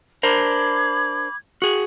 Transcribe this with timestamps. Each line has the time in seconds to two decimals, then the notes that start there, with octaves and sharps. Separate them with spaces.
0.23 D4 A#4 C5 B5 D6 G#6
1.62 F#4 G#4